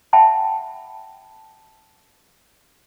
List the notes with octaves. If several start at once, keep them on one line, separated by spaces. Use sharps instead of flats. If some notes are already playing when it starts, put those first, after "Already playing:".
E5 F#5 G5 A5 B5